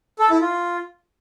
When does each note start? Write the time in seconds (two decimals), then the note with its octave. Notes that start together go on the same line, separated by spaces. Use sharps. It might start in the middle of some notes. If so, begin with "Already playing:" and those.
0.19 A4
0.30 E4
0.41 F4